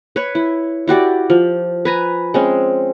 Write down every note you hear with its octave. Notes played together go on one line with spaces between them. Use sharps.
B4 C#5
E4
E4 F#4 G4 D5
F3
B4 G#5 A#5
G#3 C4 C#4